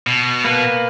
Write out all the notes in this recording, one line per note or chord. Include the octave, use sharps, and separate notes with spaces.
B2
A#3 B4